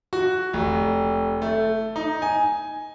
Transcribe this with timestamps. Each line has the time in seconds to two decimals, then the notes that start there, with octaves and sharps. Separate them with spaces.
0.13 F#4
0.53 F1
1.42 A3
1.96 D#4
2.22 G#5